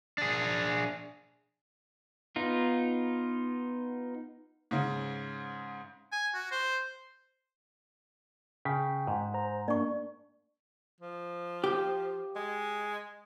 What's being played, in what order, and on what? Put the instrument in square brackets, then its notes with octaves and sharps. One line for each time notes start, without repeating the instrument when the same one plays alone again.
[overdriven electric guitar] D4 G#4
[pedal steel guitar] B3 D#4 F4
[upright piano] G#2 C#3
[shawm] G#5
F#4
C5
[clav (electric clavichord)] C#3 [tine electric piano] G5 B6
[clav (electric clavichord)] G#2
[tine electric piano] C5 A#5
[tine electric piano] A#3 D4 [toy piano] D5 C#6
[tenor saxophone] F3
[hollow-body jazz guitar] G4
[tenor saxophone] G#3